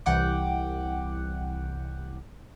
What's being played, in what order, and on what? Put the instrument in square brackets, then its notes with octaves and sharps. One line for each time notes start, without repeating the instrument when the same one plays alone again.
[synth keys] C2 E3 F#5 G5 D6